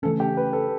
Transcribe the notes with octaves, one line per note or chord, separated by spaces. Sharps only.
C#3 E3 A3 C#4 A4
G4
B4
A4